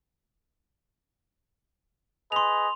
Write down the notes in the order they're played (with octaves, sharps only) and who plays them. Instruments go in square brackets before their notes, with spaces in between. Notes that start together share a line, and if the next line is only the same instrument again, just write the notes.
[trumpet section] G#4 B4 D#5 [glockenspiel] C6 F7